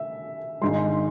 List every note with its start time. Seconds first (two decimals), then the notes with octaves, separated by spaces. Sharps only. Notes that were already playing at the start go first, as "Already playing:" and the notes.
Already playing: E5
0.61 G#1 G#2 G#3 C6